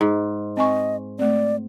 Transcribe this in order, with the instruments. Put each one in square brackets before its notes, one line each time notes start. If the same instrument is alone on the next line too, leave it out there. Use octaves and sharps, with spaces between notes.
[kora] G#2
[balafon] C4 G#5 C#6 [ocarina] D#5
[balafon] A3 C4 [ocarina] D5